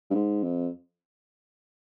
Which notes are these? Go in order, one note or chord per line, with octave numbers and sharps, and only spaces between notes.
G2
G#2
F2